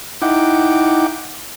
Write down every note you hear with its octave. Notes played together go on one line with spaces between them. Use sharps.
D#4 E4 F#5 G5 D6